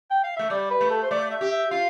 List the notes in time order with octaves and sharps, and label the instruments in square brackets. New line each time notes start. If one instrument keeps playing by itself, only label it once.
[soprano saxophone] G5
F5
[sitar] A3 [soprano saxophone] E5
[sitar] G3 [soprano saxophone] D5
[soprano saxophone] B4
[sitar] A3
[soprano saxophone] A4
C5
[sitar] A3 [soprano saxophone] D5
[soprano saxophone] E5
[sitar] G4
[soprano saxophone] E5
[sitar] F4 [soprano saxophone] F5